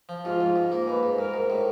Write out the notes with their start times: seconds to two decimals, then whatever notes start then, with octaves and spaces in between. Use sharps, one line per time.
0.09 F3
0.25 G#2 F4
0.41 G#2
0.56 G#2
0.72 A#3
0.87 G#2 B4
1.03 G#2
1.19 G#2 A#4
1.34 G#2
1.50 A2